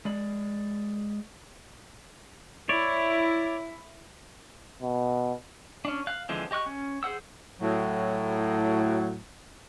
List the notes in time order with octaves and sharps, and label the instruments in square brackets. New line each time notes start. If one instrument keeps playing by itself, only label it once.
[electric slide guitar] G#3 D5
[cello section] E4 [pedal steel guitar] C#5 D5
[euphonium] B2
[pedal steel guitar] C#4 D4
F5 F#6
D3 E3 F3 G#3 C4
G4 D#5 C#6 F#6
C#4
G#4 C5 F#5 E6
[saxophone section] A2 F#3